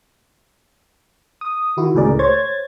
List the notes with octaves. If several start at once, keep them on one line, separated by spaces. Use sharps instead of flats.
D#6
D#3 E4 F#4
C#2 A2 G#4 A#4 D5
C5 C#5 G#6 A6